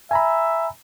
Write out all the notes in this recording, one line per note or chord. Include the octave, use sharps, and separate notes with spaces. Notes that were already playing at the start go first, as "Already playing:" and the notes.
E5 G#5 A#5 B5